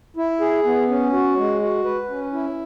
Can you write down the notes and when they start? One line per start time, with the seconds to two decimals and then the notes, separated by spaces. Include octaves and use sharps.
0.17 E4
0.40 G#4
0.65 B3
0.89 C#4
1.12 F#4
1.36 G#3
1.61 F#4
1.84 B4
2.09 C#4
2.33 E4